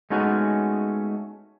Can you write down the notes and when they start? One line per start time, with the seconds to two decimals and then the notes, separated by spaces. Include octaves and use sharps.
0.10 G#3 A3 B3 C#4 D#4 F#4